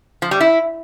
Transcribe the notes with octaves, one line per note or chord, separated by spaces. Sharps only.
F3
G3
E4